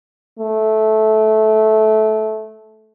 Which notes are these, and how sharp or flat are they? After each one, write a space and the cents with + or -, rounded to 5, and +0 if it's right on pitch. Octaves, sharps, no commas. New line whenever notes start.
A3 -15